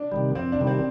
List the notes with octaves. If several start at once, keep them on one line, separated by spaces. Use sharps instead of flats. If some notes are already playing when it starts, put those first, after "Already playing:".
Already playing: D4
C3 D#3 G3
F2 C4
D4
C3 D#3 G3
C4